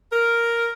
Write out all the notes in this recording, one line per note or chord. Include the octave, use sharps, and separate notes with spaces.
A#4